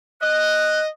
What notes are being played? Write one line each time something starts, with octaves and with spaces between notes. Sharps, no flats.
D#5 F#6